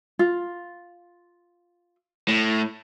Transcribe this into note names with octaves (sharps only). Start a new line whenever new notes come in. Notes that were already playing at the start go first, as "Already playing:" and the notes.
F4
A2